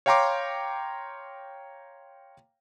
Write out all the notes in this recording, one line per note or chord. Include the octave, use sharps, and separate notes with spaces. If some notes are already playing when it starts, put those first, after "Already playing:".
C#5 F5 G5 A#5 C6 D6